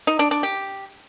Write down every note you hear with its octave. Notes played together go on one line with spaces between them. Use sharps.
D#4
D4
D4
G4